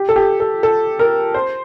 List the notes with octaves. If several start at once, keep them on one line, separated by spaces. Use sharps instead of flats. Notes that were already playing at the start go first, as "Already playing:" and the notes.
Already playing: G4
A4
G4
A4
A4
A#4
C5